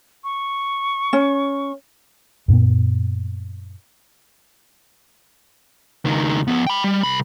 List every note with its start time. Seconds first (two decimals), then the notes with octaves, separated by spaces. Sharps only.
0.24 C#6
1.13 C#4
2.48 F#2 A#2 A#3 B3
6.05 C#2 D#3
6.48 F3 B3
6.67 G5 B5
6.84 G3
7.03 C2 B5